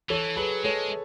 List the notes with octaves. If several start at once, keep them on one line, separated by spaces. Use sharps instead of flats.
E3 A4 C#5
F#3 G#4 B4
G#3 A4 C#5